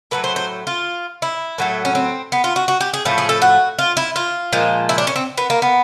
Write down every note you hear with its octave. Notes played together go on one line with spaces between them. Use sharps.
A2 F#3 A3 B4
C5
C5
F4
E4
A2 F#3 A3
C#4
C4
B3
F4
F#4
F#4
G4
G#4
A2 F3 A3
G#4
A4
F#4
F4
E4
F4
A#2 F3 G#3
E4
D4
C#4
C4
B3
A#3
B3